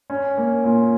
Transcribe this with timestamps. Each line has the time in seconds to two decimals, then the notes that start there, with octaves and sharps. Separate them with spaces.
0.10 C#4
0.38 A#3
0.64 A#2